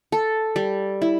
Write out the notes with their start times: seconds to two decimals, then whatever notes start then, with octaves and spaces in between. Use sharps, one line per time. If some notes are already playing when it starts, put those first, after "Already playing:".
0.12 A4
0.56 G3
1.02 E4